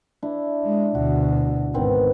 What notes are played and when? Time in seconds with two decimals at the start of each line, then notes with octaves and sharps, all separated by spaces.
0.23 D4 E4
0.64 G#3
0.95 D2 B2 F#4
1.74 G#1 D#3 B3 C4